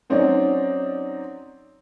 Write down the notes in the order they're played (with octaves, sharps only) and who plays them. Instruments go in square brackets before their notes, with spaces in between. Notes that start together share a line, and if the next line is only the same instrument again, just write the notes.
[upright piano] F#3 C4 C#4 D#4 D5